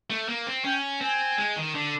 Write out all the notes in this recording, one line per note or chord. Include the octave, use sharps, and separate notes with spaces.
A3
A#3
C4
C#4 G5
C4 G#5
G#3
D#3
D3